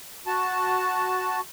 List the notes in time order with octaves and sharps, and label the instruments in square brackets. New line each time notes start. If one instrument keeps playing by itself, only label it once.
[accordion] F#4 A5